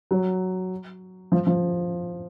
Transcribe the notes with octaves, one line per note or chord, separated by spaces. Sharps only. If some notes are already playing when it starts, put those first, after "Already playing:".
F#3
F3
F3